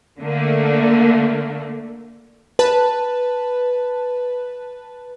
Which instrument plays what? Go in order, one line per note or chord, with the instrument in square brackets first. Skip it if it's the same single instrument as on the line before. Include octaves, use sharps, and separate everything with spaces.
[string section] D3 A3 A#3
[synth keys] B4 A5